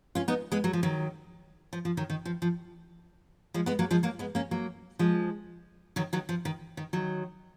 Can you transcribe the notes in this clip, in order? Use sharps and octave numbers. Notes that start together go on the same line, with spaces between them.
C#4 F4
B3 D#4
G#3 B3
F#3
F3
D#3 F#3
F3
F3
D#3 F#3
D#3
F3
F3
F3 G#3
G#3 B3
F#3 A#3
F3 G#3
F#3 A#3
G#3 B3
A#3 C#4
F#3 A#3
F3 G#3
D#3 F#3
D#3 F#3
F3
D#3
D#3
D#3 F#3